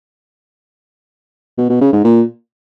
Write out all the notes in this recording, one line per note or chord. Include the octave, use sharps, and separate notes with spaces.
B2
B2
C#3
G#2
A#2